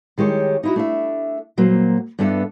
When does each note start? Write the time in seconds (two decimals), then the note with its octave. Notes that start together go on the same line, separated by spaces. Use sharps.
0.18 D#3 G#3 G4 C#5
0.63 D#4 E4 F#4
0.76 A3 D4 E5
1.57 A#2 F#3 A#3 C5
2.19 G2 B3 D4 A4 E5